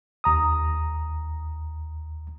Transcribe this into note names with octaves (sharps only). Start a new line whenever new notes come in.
D#2 A#5 D#6